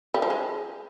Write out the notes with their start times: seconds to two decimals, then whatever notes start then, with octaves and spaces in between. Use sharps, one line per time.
0.14 G3
0.22 F3
0.30 G#3